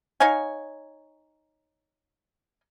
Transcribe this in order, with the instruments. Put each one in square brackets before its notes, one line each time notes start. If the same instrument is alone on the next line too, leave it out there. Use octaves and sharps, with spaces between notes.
[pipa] D#4 C#5 F5 G#5